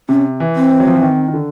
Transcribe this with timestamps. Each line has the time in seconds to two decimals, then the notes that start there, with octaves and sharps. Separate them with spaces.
0.09 C3 C#4
0.40 E3
0.55 C4
0.71 E3
0.80 F#3
0.87 F3
0.95 E3
1.02 D#3
1.28 D#3
1.34 D3